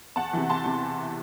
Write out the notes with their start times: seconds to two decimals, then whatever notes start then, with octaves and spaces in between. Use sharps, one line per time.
0.16 E2 F#5 A5
0.33 C3 E3
0.49 E2 A5 C6
0.66 C3